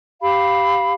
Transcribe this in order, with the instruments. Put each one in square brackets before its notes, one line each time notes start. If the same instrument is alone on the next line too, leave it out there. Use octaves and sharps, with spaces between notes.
[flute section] G4 F5 B5